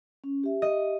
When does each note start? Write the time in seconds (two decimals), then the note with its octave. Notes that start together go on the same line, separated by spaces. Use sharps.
0.24 C#4
0.43 G4 E5
0.62 D#5